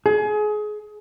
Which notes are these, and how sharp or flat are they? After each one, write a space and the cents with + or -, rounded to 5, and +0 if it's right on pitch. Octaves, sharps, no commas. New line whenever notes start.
G#4 +25